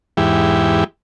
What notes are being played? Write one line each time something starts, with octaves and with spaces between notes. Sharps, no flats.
E2 G#2 E4 G4